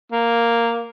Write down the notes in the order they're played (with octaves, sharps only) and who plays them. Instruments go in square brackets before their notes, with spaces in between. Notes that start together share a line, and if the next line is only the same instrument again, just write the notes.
[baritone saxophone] A#3